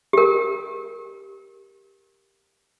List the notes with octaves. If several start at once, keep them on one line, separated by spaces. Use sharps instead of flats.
G4 A#4